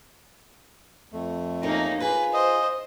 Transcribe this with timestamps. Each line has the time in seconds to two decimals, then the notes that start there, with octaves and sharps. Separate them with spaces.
1.12 F2 A3
1.63 A#3 C#4 D#4 G4 A#4
2.00 F4 G#4 B4
2.34 C5 D#5